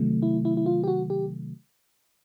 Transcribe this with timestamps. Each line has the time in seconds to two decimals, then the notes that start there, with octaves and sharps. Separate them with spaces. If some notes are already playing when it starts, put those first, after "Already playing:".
Already playing: C3 D#3 F#3 A3
0.22 E4
0.45 E4
0.57 E4
0.66 F4
0.84 G4
0.87 F#4
1.10 G4